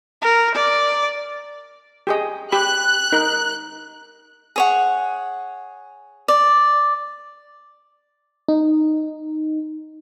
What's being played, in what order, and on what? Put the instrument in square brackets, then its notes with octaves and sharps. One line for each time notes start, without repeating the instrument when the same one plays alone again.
[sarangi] A#4
D5
[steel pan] G4 G#4 D#5
[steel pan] G4 B5 [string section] F#6
[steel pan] D#4 A#4
[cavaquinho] G#4 C#5 F#5
D5
[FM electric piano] D#4